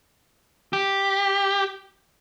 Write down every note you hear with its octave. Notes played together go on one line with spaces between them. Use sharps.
G4